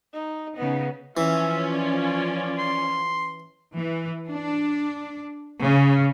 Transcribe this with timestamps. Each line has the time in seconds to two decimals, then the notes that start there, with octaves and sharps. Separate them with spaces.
0.14 D#4
0.58 C#3 B3 D#4
1.17 E3 F3 C#4 F4 E5
1.72 D5
2.58 C6
3.76 E3
4.29 D4
5.60 C#3